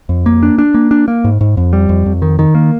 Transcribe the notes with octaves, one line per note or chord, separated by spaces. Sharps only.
F2
A#3
D4
D4
A#3
D4
A#3
G#2
G#2
F2
G3
F2
F2
D#3
D#3
A#3